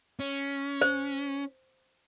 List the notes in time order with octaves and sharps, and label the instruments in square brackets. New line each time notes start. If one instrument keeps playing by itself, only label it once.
[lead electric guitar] C#4
[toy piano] C5